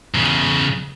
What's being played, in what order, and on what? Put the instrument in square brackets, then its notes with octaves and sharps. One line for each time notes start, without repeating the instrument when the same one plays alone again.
[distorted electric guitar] E2 C#3